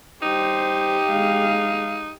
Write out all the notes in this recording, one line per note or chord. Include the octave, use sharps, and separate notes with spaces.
G3 D#4 G4 C5
G#3 F5